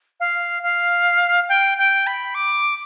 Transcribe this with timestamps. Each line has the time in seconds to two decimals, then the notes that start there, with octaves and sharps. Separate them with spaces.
0.20 F5
0.63 F5
1.49 G5
1.78 G5
2.07 B5
2.35 D6